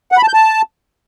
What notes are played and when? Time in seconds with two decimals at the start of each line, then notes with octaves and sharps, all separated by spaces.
0.12 F#5
0.17 B5
0.23 A5
0.28 G6
0.34 A5